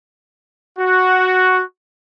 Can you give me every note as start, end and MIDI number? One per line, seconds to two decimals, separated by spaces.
0.78 1.62 66